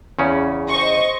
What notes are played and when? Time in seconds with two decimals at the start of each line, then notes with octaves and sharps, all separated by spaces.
0.19 E2 C#3 C#4
0.68 C5 D#5 C#6